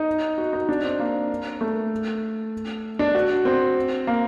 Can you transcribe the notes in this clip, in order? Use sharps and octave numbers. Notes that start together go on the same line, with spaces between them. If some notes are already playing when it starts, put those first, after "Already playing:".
Already playing: D#4
F#4
D#4
D4
C4
A#3
A3
D4
F#4
C4
A#3